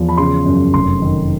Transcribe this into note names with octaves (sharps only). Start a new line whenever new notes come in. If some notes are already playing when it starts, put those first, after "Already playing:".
Already playing: E2 F3
B5
C#3 C6
F#2
F1 C6
D#3